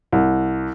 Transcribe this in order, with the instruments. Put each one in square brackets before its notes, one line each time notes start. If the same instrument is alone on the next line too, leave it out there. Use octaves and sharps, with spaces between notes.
[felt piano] C2